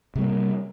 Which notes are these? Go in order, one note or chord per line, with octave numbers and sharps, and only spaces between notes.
C3 G3 A#3